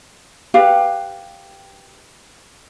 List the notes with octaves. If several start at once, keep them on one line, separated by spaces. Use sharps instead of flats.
G4 B4 F5